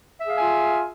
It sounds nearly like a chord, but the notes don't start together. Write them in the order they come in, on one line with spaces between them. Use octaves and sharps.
E5 G#4 F5 G#5 F4